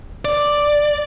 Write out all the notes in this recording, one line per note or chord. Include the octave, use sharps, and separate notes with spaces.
D5